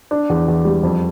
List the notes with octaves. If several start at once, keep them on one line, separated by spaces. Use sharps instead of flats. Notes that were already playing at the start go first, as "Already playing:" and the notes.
D4
E2
E2
G3
F2